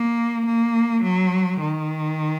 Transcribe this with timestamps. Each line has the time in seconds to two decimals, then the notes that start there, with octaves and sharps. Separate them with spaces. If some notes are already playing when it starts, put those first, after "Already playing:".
Already playing: A#3
0.46 A#3
1.03 F#3
1.61 D#3